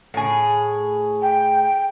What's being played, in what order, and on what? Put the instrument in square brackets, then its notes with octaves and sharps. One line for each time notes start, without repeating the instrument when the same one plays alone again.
[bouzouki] A2 G#4
[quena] G5